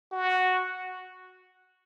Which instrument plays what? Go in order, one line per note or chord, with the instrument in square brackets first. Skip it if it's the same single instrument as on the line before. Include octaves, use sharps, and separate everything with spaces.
[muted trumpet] F#4